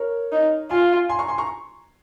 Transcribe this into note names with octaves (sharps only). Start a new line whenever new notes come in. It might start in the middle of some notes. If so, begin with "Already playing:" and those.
Already playing: A#4 C#5
D#4
F4 G#5 C6
G#5 C6
A#5 C#6
G#5 C6
A#5 C#6